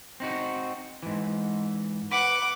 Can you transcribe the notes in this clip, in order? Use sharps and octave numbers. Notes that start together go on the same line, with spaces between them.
C4 D#4 F#4
G#2 E3
B4 F#5 D6